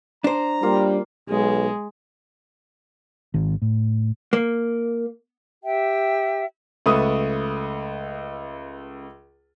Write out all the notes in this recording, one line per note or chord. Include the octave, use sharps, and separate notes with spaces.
D4 C5 A#5
G3 A#3 F4
B1 G#3
G#1
A2
A#3
G4 E5 G5
C#2 A3 B4 D#6